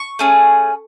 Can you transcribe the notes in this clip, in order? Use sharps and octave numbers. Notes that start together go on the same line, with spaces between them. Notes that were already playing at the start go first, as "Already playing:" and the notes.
Already playing: C#6
A3 C#4 G#4